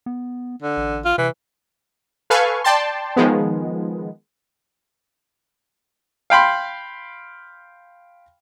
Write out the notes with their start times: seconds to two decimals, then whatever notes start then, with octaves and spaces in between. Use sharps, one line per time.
0.06 B3
0.62 D3
0.77 A1
1.04 F4
1.18 C3 E3
2.30 A4 B4 F5 G#5 C#6
2.64 D5 G5 A5 C6
3.16 D#3 F3 G#3 B3
6.30 F5 G5 B5 C6